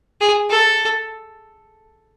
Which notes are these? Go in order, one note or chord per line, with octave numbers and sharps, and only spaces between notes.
G#4
A4